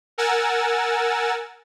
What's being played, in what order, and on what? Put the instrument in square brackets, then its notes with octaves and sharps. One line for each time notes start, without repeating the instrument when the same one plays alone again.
[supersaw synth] A#4 F#5 G#5 E6 A6